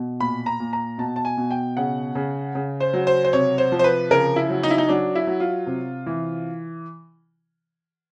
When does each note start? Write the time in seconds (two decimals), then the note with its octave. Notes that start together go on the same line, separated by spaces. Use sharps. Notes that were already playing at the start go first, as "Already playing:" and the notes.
Already playing: B2
0.20 A#2 B5
0.46 A#5
0.60 A#2
0.73 A#5
0.98 B2 A5
1.16 A5
1.25 G#5
1.37 B2
1.51 G5
1.77 C#3 F#5
2.15 C#3
2.55 C#3
2.80 C5
2.94 F#3
3.07 C5
3.25 C5
3.33 C3 C#5
3.58 C5
3.72 F3
3.79 C5
3.84 B4
4.11 C#3 A#4
4.36 E4
4.50 F#3
4.63 D#4
4.70 E4
4.78 D#4
4.89 F#3 D4
5.15 E4
5.27 F#3
5.40 F4
5.67 C3
6.06 E3